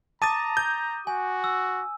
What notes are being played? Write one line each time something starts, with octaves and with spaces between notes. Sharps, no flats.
A5 A#5 D6 D#6 A6 D#7
G6
F#4 G#5
E6